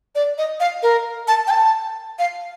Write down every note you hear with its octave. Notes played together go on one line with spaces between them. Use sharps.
D5
D#5
F5
A#4
A5
G5
A5
F5